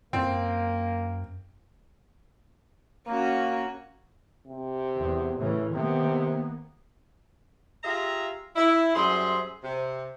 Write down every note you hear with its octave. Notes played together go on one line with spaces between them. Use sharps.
F#2 A#3 C4
A#3 C#4 F#4
C3
E2
A2 C#3 E3
C3 D#3 A#3 B3
F4 G4 G#4 E5 F5 A#5
E4
F#2 G3 G#4 C5 E5 C6
C3